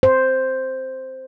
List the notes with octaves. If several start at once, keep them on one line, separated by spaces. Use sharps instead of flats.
C5